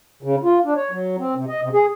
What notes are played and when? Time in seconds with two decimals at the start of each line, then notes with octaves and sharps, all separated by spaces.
0.23 C#3
0.43 F4
0.64 D4
0.76 C#5
0.91 F#3
1.19 C4
1.35 C3
1.48 D#5
1.62 C3
1.73 G#4